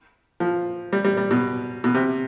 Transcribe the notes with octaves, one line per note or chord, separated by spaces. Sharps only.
F3
G3
G3
G3
B2
B2
C3